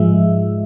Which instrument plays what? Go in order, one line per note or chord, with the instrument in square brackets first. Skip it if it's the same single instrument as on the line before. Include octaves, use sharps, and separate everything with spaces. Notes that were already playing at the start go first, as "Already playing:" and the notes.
Already playing: [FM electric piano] G#2 F3 G#3 E5